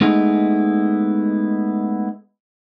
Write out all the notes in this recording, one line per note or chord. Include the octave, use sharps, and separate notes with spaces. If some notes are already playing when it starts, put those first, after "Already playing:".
G#3 A3 B3 D#4 E4 G#4